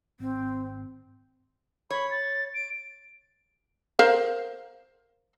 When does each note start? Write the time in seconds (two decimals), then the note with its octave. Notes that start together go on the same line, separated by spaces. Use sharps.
0.20 G#1 C4
1.90 C#5 B5
2.11 A6
2.54 D7
3.99 A#4 C5 F5